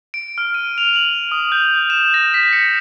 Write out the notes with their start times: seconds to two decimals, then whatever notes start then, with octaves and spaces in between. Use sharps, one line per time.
0.14 D7
0.38 F6
0.54 D#7
0.78 F7
0.96 F#7
1.32 D#6
1.52 G6
1.90 E7
2.14 A#6
2.34 B6
2.53 C#7